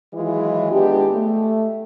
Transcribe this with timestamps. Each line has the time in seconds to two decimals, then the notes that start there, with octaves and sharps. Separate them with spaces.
0.14 D#3 E3 F#3 G#3 E4 F4
0.72 G#3 B3 D4 G4
1.14 A3